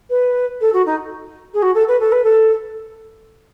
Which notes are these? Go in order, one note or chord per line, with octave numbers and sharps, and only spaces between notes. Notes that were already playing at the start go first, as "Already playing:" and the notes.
B4
A4
F#4
D#4
G#4
F#4
A4
B4
A4
B4
A4